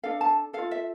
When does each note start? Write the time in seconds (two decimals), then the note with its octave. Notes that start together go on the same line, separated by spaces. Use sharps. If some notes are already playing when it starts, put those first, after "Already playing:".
0.03 D4 A4 F5
0.21 A5
0.53 F4 A4 F5
0.71 E5